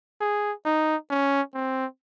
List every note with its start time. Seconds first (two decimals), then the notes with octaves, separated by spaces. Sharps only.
0.21 G#4
0.65 D#4
1.10 C#4
1.54 C4